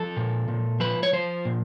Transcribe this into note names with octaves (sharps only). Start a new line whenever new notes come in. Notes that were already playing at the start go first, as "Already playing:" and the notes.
Already playing: F3 A4
A#2
A#2
F3 B4
C#5
F3 C5
A#2